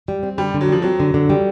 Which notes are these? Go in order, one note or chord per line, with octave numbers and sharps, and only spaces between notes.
G3
C4
D3 G3
D3
F#3
F3 G3
F#3 C4
D3
D3
G3